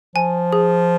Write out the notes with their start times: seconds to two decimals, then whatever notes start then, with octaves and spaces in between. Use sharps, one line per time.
0.16 F3 G#5
0.53 G#4